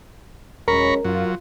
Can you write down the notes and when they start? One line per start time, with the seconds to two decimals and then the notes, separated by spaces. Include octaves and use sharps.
0.68 D#1 F#3 G#3 C#4 A#4 A#5 B5 C#6
1.04 F#2 F#3 F4